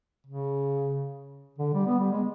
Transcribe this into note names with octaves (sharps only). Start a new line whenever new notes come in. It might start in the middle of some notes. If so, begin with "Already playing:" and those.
C#3
D3
G3
B3
G3
G#3